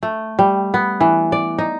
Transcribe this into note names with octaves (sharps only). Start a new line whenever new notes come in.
A3
G3
B3
E3
D5
D#4